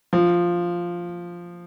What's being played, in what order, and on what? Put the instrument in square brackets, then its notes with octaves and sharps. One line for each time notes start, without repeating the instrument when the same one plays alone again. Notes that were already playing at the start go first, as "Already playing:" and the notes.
[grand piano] F3